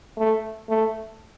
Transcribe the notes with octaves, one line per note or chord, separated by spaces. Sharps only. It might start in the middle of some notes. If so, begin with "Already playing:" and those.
A3
A3